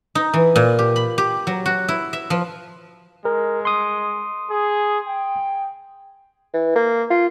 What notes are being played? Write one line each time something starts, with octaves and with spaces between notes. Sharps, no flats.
D#4
E3
A#2
G4
B5
G4
F#3
F#4
E4
E5
F3
G#3 A#4
C6 D#6
G#4
G5
E3
A#3
F4